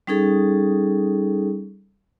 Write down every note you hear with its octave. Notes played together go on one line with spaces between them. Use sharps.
G3 C#4 D#4 G#4 A4